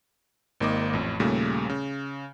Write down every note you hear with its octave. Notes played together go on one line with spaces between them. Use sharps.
G#1 D#3 A#3 D#5 D6
A1 F2
D#2 A#2 C#3 G3 A3
C#3